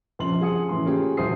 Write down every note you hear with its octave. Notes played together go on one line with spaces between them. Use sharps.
A#1 F2 C#3 F3 C6 F#7
F3 G#4 F#5 D#6 C#7
A2 C#3 E3 C6
A3 A#3 C#4 F4 G4 G#4
D#1 D2 F#4 C5 D#6 C7